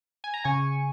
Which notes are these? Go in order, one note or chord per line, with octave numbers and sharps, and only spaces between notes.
G#5
A#5
C#3 G#5 C#6